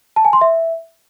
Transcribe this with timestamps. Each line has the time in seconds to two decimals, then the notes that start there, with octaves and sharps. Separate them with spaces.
0.16 A5
0.25 G#5
0.33 C6
0.41 E5